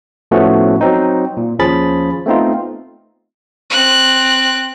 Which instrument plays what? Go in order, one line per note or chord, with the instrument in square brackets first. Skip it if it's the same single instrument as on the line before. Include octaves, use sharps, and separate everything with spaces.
[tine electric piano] A2 F3 A3 B3 C#4 F#4
F#3 C4 D#4
A#2
D#2 F3 C#4 G#4 B5 A6
A3 B3 C4 D#4 F4
[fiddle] C4 F#6